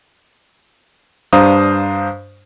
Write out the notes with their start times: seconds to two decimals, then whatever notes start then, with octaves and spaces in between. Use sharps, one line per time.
1.33 G2 D4 C5 F5 A#5 D#6